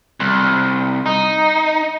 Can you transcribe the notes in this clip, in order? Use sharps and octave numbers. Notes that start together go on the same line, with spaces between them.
C2
D#4